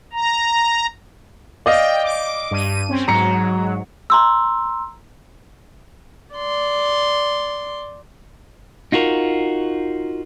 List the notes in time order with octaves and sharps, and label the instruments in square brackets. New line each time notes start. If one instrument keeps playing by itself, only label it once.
[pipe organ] A#5
[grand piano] D5 D#5 F5 [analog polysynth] G5
[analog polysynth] D6
G2 D#7
C4 C#4
[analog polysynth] G#2 F#3 [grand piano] A#5 C#7
[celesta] A#5 C6 E6
[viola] D5 C6
[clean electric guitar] D#4 F4 F#4 A#4